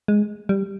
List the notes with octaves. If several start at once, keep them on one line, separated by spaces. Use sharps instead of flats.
G#3
G3